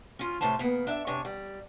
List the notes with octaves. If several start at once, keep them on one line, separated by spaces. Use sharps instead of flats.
C#4 F4
A2 C3 C#4 C5 A5
C#3 A#3 B3
D4 E5
C3 D4 C#5 G#5
G3